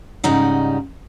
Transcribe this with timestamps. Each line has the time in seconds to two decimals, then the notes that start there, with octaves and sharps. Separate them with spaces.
0.24 G#2 C#3 G3 D#4 F#5